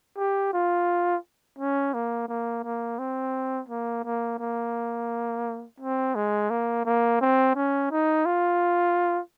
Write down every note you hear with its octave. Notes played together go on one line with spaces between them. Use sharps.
G4
F4
C#4
A#3
A#3
A#3
C4
A#3
A#3
A#3
C4
G#3
A#3
A#3
C4
C#4
D#4
F4